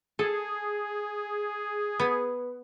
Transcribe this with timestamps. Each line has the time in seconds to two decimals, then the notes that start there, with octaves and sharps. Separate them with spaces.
0.19 G#4 A4
2.00 B3